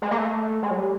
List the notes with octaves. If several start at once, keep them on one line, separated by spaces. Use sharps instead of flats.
G#3
A#3
A3
G#3
F#3
G3